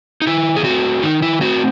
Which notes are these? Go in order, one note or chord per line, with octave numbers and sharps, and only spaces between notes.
D#4
D#3 E4
G#4
A3 C4 F#4
D#3 D#4
E4
A3 C4 F#4